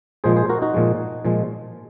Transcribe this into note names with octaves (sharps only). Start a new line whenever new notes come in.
A#2 F3 G#3 G#4 C5
G#4 C5
F#4 A#4
D#4 F#4
A#2 F3 G#3
A#2 F3 G#3